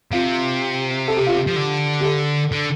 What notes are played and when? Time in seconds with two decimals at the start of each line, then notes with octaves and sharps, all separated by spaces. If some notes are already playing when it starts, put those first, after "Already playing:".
0.12 C3 F4
1.08 A4
1.17 G4
1.27 F4
1.36 G4
1.47 F3
1.56 D3
2.00 G4
2.04 A4
2.52 D3